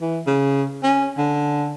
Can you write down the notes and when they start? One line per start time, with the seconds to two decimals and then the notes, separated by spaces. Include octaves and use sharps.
0.01 E3
0.27 C#3
0.83 C#4
1.18 D3